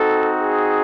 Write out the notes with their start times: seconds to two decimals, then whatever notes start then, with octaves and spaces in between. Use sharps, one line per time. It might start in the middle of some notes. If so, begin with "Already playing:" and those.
Already playing: C4 D#4 F#4 A4
0.40 G#4